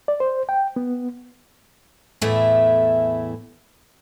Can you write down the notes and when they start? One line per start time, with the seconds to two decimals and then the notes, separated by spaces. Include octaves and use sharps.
0.08 D5
0.20 C5
0.49 G5
0.76 B3
2.21 E2 A2 E3 A3 E4